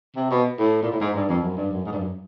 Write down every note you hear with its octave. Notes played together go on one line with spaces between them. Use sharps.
C3
B2
A2
A#2
A2
G#2
G2
F2
F#2
G2
F#2
G#2
G2
F#2